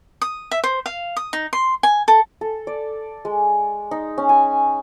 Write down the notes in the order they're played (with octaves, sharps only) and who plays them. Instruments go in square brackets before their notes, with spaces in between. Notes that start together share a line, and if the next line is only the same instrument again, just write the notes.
[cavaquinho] D#6
E5
C5
F5
D#6
D#4
C6
G#5
A4
[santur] A4
D5
G#3
D#4
C#4
G#5